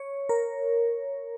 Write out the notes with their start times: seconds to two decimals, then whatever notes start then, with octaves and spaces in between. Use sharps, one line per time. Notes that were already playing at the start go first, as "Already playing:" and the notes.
Already playing: C#5
0.29 A#4